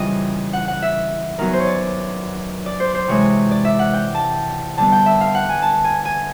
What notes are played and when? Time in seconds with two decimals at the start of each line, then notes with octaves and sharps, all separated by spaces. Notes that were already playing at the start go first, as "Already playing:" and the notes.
Already playing: F2 C#3 E3 G3 D#5
0.53 F#5
0.68 F#5
0.82 E5
1.38 F#2 D#3 F#3 B3 A#4
1.53 C5
1.60 C#5
1.67 D5
2.66 D5
2.80 C5
2.95 C5
3.08 C3 E3 G#3 C#5
3.51 D5
3.65 E5
3.79 F#5
3.93 G5
4.14 A5
4.78 D3 G3 B3 A5
4.92 G5
5.06 E5
5.21 F5
5.35 F#5
5.49 G#5
5.62 A5
5.84 G#5
6.05 G#5